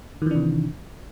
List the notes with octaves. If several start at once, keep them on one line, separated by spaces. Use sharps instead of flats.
C3 D#3 E3 D4